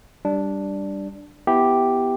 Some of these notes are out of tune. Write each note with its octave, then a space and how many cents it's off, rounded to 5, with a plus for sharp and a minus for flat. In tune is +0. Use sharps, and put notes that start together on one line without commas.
G3 +0 D4 +0
B3 +0 E4 +0 G4 +0